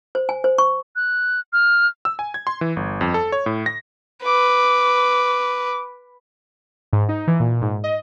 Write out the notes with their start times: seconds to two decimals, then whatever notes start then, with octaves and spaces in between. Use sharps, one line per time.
0.15 C5
0.29 G#5
0.44 C5
0.58 C#6
0.96 F#6
1.53 F6
2.05 E6
2.19 G#5
2.34 G#6
2.47 C6
2.61 E3
2.76 G1
3.01 F2
3.14 A4
3.32 C#5
3.46 A2
3.66 A#6
4.25 B4 D6
6.93 G#2
7.09 D#4
7.27 E3
7.40 A#2
7.62 G#2
7.84 D#5